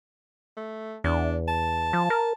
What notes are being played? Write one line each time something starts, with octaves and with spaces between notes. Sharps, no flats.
A3
E2 D4
A5
F3
A#4